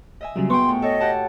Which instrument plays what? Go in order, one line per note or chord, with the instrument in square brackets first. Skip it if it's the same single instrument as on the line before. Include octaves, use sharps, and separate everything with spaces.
[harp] D#5 E5 G#5
[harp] A#2 [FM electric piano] C#3 F#3 G3
[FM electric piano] B3 C#6 [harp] F#4 G#4 G5 [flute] C6
[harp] A2
[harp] A4 C#5 [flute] D#5
[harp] G4 F#5 A5